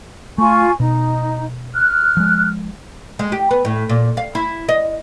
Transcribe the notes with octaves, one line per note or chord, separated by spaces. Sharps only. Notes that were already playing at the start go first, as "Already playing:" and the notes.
A3 F4 G#5 C#6
B2 D#4
F6 F#6
F3 G#3
G#3
G4
B3
A2
A#2
F5
E4
D#5